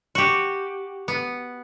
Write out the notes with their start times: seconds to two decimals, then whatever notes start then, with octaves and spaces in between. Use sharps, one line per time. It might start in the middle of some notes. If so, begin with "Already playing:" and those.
0.15 F#4 G4
1.08 B3